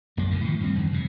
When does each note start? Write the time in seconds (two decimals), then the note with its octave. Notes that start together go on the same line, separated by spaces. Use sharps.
0.17 A#1 F#2 A#2 A#3
0.31 C#2 F#2 D3
0.44 A2 D#3 F3
0.60 D2 G2 G#3 C4
0.74 E2 G2 D#3
0.91 F1 G2 C3